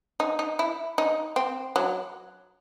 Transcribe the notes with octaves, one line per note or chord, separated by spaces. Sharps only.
D#4
D#4
E4
D#4
C4
F#3